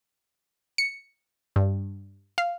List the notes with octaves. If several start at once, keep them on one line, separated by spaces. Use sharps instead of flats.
C#7
G2
F5